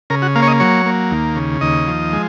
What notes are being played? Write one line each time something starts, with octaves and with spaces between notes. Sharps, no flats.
C#3 A#4
F#4
A#3 F5
C#5
D#5
F#3 C#5
A#3
D#2
C#3
D#2 D#5
F3
G#3